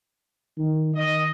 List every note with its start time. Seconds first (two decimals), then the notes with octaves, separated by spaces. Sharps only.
0.58 D#3
0.95 D#3 D#5